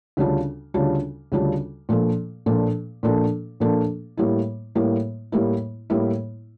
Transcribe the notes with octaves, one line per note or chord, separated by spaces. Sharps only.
D2 C#3 G3 D4 F4
D2 C#3 G3 D4 F4
D2 C#3 G3 D4 F4
A#2 F3 A#3 D4 A4
A#2 F3 A#3 D4 A4
A#2 F3 A#3 D4 A4
A#2 F3 A#3 D4 A4
A2 G3 A#3 E4
A2 G3 A#3 E4
A2 G3 A#3 E4
A2 G3 A#3 E4